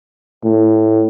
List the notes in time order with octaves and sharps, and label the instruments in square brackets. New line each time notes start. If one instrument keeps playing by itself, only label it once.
[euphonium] A2